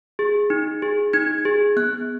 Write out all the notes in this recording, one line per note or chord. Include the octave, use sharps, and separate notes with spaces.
G#4
D#4
G#4
D#4 G#6
G#4
B3 F#6